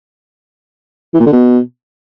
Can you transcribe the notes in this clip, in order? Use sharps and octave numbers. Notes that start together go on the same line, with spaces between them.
E3
A#2
D3
B2